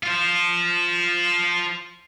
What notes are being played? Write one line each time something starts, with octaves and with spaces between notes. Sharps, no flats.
F4 C5